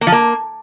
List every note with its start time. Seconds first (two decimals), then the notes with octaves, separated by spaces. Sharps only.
0.01 A#3
0.07 F3
0.12 A#3